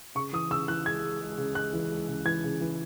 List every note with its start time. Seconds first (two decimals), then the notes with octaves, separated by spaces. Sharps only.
0.15 C#3 C#6
0.33 E3 D#6
0.51 C#3 E6
0.68 E3 F#6
0.86 G#3 G#6
1.04 G#3
1.21 G#3
1.38 C#3
1.55 G#3 F#6
1.73 E3
1.90 G#3
2.08 C#3
2.25 E3 G#6
2.44 C#3
2.61 E3